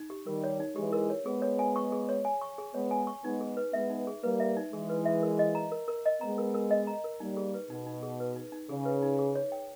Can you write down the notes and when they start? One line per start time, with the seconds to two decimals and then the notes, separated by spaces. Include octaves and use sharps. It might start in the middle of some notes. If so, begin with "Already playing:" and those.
Already playing: D#4
0.10 G4
0.26 D#3 G3 A#4
0.44 C#5
0.60 D#4
0.76 E3 G#3 G4
0.93 A#4
1.10 C#5
1.26 G#3 B3 G#4
1.42 C#5
1.59 G#5
1.76 C#6
1.92 G#4
2.09 C#5
2.25 G#5
2.41 C#6
2.58 G#4
2.74 G#3 B3 C#5
2.91 G#5
3.07 C#6
3.24 G#3 B3 D#4
3.41 G#4
3.57 B4
3.73 G#3 B3 E5
3.90 D#4
4.07 G#4
4.23 G3 A#3 B4
4.40 E5
4.57 D#4
4.72 E3 G#3 G#4
4.89 B4
5.05 E5
5.23 A#4
5.39 D#5
5.55 A#5
5.72 A#4
5.88 A#4
6.06 D#5
6.21 G#3 B3 A#5
6.38 A#4
6.54 A#4
6.71 D#5
6.87 A#5
7.04 A#4
7.20 G3 A#3 D#4
7.37 G#4
7.54 B4
7.70 B2 D#4
7.86 D#4
8.03 G#4
8.20 B4
8.36 D#4
8.52 D#4
8.69 C#3 G#4
8.85 B4
9.03 D#4
9.19 G#4
9.35 C#5
9.52 G5